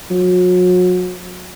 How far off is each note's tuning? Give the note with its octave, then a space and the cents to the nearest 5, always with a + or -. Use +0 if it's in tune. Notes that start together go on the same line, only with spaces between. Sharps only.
F#3 -35